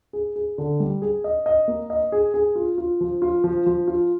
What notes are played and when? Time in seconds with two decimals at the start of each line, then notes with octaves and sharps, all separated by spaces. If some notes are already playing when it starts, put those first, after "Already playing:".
0.13 G#4
0.36 G#4
0.58 D3
0.80 G3
1.02 G#4
1.24 D#5
1.46 D#5
1.68 A#3
1.90 D#5
2.12 G#4
2.34 G#4
2.55 F4
2.78 F4
3.00 F3
3.22 F4
3.44 F3
3.66 F3
3.87 F4